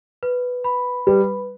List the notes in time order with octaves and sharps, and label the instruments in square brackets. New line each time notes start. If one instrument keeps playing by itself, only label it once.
[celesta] B4
B5
[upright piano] G3 [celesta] B4